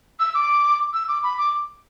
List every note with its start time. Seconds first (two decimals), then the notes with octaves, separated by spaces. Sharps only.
0.20 E6
0.35 D6
0.93 E6
1.08 D6
1.23 B5
1.38 D6